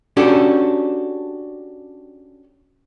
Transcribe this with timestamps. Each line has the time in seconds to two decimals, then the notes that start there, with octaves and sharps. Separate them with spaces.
0.17 C#4 D4 F#4 G4 A4